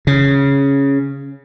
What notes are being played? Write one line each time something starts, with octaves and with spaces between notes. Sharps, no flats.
C#3